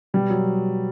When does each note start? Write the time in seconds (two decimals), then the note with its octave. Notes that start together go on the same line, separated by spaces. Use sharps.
0.14 B2 G3
0.30 F#3